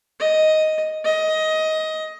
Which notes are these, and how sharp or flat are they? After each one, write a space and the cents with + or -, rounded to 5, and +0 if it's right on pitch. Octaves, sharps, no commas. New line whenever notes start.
D#5 +5
D#5 +15